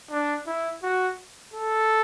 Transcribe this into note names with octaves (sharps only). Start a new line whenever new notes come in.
D4
E4
F#4
A4